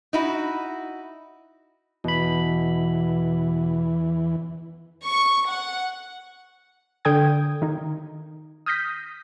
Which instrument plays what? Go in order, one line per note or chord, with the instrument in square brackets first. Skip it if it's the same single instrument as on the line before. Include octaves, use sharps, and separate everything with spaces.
[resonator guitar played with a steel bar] D#4 E4 F#4
[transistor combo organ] E2 E3 [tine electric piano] B2 B5
[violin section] C#6
F#5
[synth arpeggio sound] D3 A4 G5 D#6 G#6
D#3 D#4
D#6 F6 G6 A#6 B6